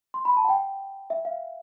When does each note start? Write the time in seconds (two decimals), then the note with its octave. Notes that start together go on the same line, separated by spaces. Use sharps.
0.14 C6
0.25 B5
0.37 A5
0.44 F#5
0.49 G5
1.10 E5
1.25 F5